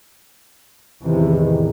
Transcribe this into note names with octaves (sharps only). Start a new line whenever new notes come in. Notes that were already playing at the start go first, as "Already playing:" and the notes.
E2 A2 C3 D#3 E3